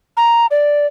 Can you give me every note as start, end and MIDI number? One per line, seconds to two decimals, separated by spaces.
0.17 0.46 82
0.51 0.86 74